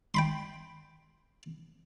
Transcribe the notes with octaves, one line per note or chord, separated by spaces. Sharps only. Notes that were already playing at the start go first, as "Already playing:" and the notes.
G5 B5 C6